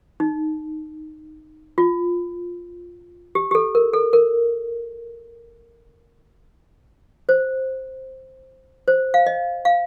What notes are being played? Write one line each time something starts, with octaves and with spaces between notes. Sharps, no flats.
D#4
F4
G4
G4
A4
A#4
A4
A#4
C5
C5
F5
D#5
F5